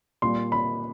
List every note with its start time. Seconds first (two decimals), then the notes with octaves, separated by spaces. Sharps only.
0.22 A#2 G3 A#3 C6
0.52 B5